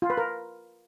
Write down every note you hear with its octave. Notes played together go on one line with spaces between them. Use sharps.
F4
B4
A#4